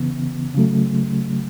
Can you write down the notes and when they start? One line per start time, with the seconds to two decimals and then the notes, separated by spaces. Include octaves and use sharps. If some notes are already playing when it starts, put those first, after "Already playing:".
Already playing: C#3 E3 B3
0.54 C#3 F#3 A3